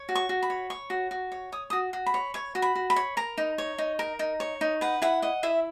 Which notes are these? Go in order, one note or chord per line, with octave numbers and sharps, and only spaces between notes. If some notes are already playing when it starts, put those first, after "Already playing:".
Already playing: C#5
F#4
C#6
F#4
B5
C#5
C#5 C#6
F#4
F#4
C#5
C#5 D#6
F#4 D#6
F#4
B5
C#5
C#5 C#6
F#4
B5
F#4
B5
C#5
A#4 A#5
D#4
C#5
D#4
A#4
D#4
C#5
D#4
B4 F#5
E4 F#5
D#5 F#5
E4 E5